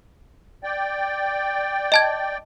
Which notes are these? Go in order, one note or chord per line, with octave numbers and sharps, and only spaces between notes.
D5 G5
D#5 A5 G#6